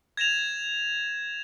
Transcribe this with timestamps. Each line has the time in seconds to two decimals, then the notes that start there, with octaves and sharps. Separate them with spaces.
0.17 G#6 A#6 E7 F7